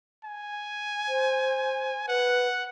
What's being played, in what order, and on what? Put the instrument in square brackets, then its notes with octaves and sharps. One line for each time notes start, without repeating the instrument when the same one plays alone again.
[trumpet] G#5
[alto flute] C5
[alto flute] B4 [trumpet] F#5